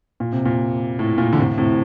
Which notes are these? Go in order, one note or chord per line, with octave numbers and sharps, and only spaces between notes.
A#2
C3
A#2
A2
A#2
D3
A2 C3
A2 C3